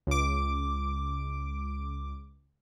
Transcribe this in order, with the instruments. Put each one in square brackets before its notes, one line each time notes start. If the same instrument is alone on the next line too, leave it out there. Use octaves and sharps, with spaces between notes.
[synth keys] C#2 D6